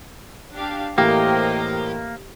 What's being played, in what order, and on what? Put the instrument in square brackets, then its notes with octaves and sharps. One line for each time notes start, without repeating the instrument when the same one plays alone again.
[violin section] D4 G4 F5
[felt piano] A2 E3 [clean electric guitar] A#3 [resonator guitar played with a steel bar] G4 [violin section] A#4 C5 D#5